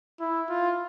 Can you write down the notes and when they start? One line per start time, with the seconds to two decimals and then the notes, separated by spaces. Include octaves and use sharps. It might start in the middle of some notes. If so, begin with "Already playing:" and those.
0.20 E4
0.50 F4